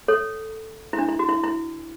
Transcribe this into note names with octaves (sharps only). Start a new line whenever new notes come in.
A4 C#5
E4
D4
E4
F#4
E4
E4